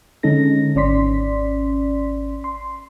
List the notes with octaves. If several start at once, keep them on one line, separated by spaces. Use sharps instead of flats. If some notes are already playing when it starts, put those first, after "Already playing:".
D3 G#3 C#4 D#4 A4 A#6
G#1 C#4 D5 C6 B6
C6